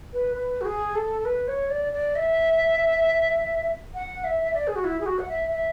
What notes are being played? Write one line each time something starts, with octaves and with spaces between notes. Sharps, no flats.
B4
B4
F#4
G#4
A4
B4
C#5
D5
D5
E5
F#5
E5
E5
D5
G#4
F#4
E4
G#4
F#4
F#5
E5
E5